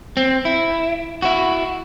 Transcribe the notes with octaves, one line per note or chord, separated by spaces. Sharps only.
C4
E4
E4 F#4